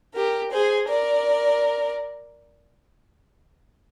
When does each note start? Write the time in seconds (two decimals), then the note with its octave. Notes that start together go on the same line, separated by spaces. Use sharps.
0.15 G4 A#4
0.52 G#4 C5
0.88 A#4 D5